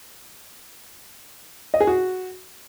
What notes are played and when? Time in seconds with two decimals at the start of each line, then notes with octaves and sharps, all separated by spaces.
1.74 D#5
1.80 G#4
1.87 F#4